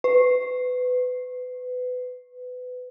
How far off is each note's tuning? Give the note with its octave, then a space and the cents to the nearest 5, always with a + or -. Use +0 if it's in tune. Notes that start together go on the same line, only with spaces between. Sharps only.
B4 +25